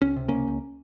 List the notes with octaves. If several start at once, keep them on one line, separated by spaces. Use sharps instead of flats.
C#2 C#4
C3
C#2 A#3 C#4
C#2